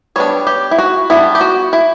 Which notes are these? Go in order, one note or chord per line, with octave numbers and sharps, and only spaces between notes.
G3 B3 D4 C#5
G4
E4
F#4
G3 B3 D4 E4
G4
F#4
E4